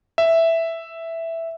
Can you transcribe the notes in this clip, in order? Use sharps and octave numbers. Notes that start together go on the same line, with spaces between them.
E5